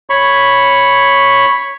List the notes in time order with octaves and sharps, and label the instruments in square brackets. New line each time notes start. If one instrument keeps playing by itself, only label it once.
[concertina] C#5 B5 C#6